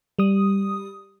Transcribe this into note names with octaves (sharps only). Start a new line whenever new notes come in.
G3 D#6